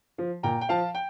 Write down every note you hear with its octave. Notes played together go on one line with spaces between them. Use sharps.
F3
A#2 G5 A#5
G5
F3 F5 A5
G5